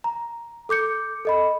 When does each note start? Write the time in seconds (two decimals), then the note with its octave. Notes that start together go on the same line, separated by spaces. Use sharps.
0.04 A#5
0.69 A4 D6 G6 C#7
1.25 A4 D#5 B5